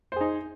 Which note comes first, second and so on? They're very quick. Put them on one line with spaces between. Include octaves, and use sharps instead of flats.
C5 G#4 D#4